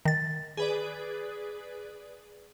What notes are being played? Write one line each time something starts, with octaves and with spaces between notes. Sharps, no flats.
D#3 A6
G#4 B4 D5